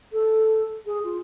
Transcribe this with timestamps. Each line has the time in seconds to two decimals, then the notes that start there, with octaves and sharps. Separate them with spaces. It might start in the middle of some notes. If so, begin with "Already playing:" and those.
0.13 A4
0.86 G#4
1.04 F4